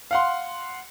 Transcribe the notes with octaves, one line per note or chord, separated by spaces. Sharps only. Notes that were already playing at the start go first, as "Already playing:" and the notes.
F5 F#5 C6